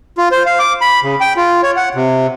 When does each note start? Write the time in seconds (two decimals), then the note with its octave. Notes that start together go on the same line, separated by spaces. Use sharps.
0.18 F4
0.32 C5
0.46 F5
0.59 D6
0.81 B5
1.03 C#3
1.21 G5
1.37 F4
1.63 C#5
1.76 F#5
1.95 C3